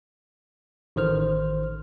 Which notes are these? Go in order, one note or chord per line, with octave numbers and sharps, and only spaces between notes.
A1 D#3 C5 F6